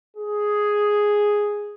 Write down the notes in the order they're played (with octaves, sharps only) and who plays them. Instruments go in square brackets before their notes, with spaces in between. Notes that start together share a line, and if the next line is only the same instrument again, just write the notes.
[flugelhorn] G#4